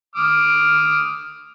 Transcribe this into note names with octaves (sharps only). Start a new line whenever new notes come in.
D6 D#6 F6